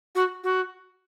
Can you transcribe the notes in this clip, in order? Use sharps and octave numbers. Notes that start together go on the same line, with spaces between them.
F#4
F#4